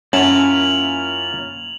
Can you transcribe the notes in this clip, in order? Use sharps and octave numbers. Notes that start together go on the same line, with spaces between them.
F#2 A#3 C#4 E4 F4 A5 F7 F#7